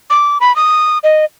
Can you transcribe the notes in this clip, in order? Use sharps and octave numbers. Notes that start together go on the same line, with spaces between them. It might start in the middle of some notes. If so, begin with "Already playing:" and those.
D6
B5
D#6
D#5